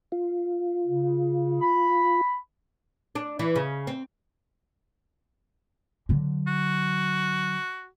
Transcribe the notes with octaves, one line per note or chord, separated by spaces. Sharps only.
F4
C#3
B5
D4
E3
C#3
C4
D3 F#3
F#4